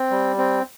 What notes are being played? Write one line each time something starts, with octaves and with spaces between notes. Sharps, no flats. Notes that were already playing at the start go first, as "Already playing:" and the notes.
Already playing: C4
G3
C4